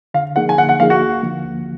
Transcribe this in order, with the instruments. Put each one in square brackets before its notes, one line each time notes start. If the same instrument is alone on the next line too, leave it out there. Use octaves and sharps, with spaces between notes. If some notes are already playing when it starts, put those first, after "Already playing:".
[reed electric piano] D3 [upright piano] F5
[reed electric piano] F3 A#3 D#4 G#4 [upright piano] F#5
[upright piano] G#5
[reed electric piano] D3 [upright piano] F#5
[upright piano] F#5
[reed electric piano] F3 A#3 D#4 G#4 [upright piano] F5
[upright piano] F#4
[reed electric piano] D2
D3 F3 A#3
D2